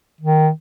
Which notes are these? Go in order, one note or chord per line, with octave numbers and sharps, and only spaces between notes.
D#3